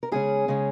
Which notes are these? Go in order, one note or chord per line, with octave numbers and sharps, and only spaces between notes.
A#4
C#3 G#3 C#4 G#4
C#3 G#3 C#4